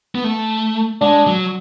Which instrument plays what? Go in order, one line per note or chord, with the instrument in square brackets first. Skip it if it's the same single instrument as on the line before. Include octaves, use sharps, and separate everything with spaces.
[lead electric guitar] B3
A3
[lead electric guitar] G#3 [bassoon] D4
[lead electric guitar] F#3